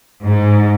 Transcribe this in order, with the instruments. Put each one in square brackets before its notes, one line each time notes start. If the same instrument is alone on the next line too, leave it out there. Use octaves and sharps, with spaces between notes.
[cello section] G#2